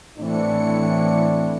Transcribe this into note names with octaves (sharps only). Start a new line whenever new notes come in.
A2 E3 C4 D4 C#7